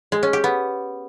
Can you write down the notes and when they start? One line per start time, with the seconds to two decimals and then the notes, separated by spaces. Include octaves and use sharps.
0.12 G#3
0.23 C#4
0.33 G4
0.44 B3